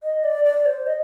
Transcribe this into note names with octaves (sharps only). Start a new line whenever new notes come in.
D#5
D5
D5
C5
D#5